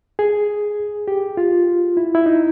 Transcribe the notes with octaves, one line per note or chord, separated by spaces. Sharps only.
G#4
G4
F4
E4
E4
D#4